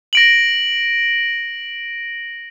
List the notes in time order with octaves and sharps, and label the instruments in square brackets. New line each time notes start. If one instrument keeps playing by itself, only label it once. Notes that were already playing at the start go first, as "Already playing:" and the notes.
[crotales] A#6 D7 F#7